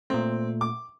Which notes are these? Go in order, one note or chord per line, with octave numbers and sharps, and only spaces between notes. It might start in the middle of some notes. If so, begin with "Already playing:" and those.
A#2 A3 C4
D6